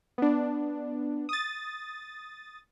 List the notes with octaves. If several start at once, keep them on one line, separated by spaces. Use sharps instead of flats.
B3 D4
D#6 A6